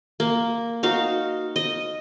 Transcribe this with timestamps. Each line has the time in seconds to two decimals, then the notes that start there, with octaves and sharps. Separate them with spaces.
0.20 A#3
0.83 D#4 F#4 F5
1.56 D#5